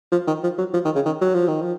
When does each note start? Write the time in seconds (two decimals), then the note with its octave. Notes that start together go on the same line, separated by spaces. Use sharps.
0.12 F3
0.27 D#3
0.43 F3
0.58 F#3
0.74 F3
0.85 D#3
0.95 C#3
1.06 D#3
1.21 F#3
1.34 F3
1.48 D#3
1.61 F3